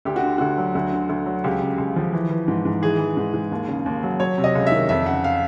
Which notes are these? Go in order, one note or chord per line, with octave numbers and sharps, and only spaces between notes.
D2 G4
F#4
D3
D2 F#4
F#3
D2
D3
D2
F#3
C#2 G4
C#3
C#2
F3
E3
E3
G#2
G#2
E3 G#4
E3
G#2
G#2
D#2
C#3
D#2
F#3
F#3 C#5
C3
D#5
C#2
E5
D#3
F2 E5
C#3 F#5
F5